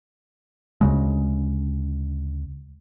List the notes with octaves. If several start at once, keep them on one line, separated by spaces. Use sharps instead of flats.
D2 C#3 G#3